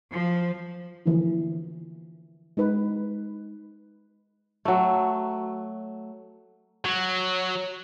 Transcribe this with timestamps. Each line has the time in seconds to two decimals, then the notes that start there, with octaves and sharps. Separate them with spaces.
0.13 F3
1.06 D3 E3 F3 A#3 E4
2.57 G#3 D#4 B4
4.65 F#3 A3
6.85 F#3